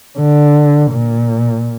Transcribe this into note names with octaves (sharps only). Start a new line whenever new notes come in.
D3
A#2